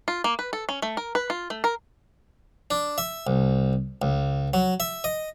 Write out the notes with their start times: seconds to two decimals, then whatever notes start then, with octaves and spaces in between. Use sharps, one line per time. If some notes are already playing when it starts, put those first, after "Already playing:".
0.08 F4
0.24 A#3
0.39 B4
0.53 A4
0.69 C#4
0.82 A3
0.97 A#4
1.15 B4
1.30 F4
1.50 A3
1.64 A#4
2.71 D4
2.98 E5
3.27 C2
4.02 C#2
4.54 F#3
4.80 E5
5.04 D#5